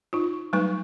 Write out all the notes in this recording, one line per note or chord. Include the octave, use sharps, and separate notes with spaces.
D#4 F4
F#3 G3 A3 D#4 B4